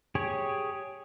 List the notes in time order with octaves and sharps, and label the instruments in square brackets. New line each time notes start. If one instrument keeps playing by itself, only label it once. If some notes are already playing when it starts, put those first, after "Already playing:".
[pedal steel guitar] G4 G#4 C#5